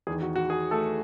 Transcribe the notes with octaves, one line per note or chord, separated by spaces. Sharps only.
E2 D#3 G#4
F#4
F#4
G#4
A3 A4